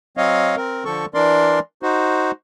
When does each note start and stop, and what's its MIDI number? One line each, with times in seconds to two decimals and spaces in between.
0.17 0.56 54
0.17 0.56 60
0.17 0.56 73
0.17 0.56 75
0.17 0.56 77
0.56 0.84 60
0.56 0.84 70
0.85 1.06 50
0.85 1.06 53
0.85 1.06 69
0.85 1.06 85
1.14 1.59 52
1.14 1.59 62
1.14 1.59 70
1.14 1.59 74
1.14 1.59 84
1.83 2.31 63
1.83 2.31 66
1.83 2.31 72